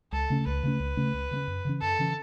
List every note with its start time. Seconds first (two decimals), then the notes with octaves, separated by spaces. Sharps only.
0.12 C#2 A4
0.30 C#3 A3 C#4
0.46 C#2 B4
0.63 C#3 A3 C#4
0.80 C#2
0.97 C#3 A3 C#4
1.14 C#2
1.31 C#3 A3
1.36 C#4
1.47 F#2
1.65 C#3 E3 C#4
1.81 F#2 A4
1.99 C#3 E3 C#4